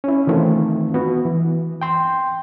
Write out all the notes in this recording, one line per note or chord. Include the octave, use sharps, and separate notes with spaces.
C#4 E4
D#3 E3 A3 C4 F4
B3 F#4
E3
G5 C6